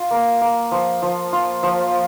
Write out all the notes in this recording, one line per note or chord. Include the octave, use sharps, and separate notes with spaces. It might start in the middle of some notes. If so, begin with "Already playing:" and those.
Already playing: F4
A#3
A#3
F3
F3
F4
F3